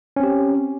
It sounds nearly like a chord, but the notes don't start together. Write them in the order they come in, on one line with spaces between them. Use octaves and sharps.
C#4 C4 G4